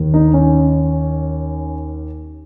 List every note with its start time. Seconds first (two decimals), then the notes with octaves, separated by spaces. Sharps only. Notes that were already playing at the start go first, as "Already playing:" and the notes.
Already playing: D#2 D#3
0.14 D#4
0.34 C#4